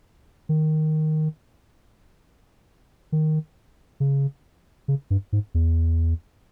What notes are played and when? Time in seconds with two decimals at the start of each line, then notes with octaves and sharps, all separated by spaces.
0.49 D#3
3.12 D#3
4.00 C#3
4.88 C#3
5.10 G2
5.33 G#2
5.54 E2